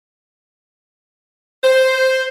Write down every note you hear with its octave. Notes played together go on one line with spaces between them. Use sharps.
C5